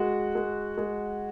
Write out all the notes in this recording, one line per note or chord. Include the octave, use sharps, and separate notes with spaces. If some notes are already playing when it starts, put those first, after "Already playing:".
Already playing: G#3 F#4
G#3
G#3